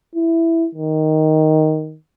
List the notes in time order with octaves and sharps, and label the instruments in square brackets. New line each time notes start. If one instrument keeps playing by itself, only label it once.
[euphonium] E4
D#3